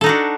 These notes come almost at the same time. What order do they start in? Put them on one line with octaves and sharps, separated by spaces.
A4 D#4 F#4 D4